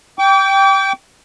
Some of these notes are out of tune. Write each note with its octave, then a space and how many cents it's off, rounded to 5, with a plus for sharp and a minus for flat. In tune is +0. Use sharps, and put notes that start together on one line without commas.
G5 +0 D6 -40